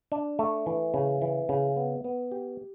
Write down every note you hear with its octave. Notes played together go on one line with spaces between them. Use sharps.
D4
A3
E3
C#3
E3
C#3
B3
B3
G4